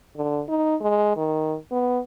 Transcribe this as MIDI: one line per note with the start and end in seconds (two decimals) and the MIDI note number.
0.16 0.41 50
0.49 0.75 63
0.81 1.12 56
1.17 1.56 51
1.71 1.99 59